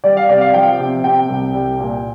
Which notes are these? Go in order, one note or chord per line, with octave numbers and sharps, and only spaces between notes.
G3 D5
F5
C3 D5
F5
F3 G5
C3
C3 G5
C2
G3
A#2